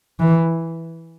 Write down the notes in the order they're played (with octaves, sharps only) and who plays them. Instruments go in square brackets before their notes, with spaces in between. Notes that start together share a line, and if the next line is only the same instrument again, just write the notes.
[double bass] E3